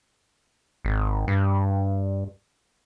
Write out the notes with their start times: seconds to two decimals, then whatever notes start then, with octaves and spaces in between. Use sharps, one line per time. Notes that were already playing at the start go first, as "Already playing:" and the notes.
0.85 G#1
1.28 G2